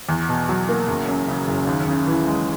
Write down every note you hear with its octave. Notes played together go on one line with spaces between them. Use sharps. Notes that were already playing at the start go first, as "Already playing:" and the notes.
E2
B2
F#3
A#3
F#1
F#2
C#3
F#1
D#2
C#3
E3
G#3